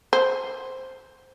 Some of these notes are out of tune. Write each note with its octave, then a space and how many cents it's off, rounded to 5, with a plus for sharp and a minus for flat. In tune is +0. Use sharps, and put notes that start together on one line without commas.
C5 +0